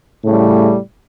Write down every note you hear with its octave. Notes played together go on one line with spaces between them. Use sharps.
A2 C#3 G3 A3